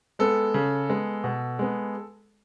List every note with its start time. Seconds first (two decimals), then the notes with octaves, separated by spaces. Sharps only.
0.19 G#3 B3 A4
0.54 C#3
0.89 G#3 B3
1.24 B2
1.59 G#3 B3